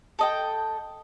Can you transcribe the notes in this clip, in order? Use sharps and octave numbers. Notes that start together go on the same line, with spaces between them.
A4 D#5 G5